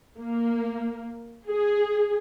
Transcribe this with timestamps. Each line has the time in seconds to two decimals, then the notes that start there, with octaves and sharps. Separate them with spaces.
0.18 A#3
1.48 G#4